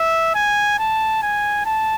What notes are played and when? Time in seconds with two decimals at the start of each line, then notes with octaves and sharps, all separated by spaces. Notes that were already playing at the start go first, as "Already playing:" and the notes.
Already playing: E5
0.35 G#5
0.79 A5
1.22 G#5
1.66 A5